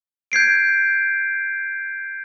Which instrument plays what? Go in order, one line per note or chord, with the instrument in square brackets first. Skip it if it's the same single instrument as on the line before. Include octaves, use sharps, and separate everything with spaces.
[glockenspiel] G6 G#6 C7 D7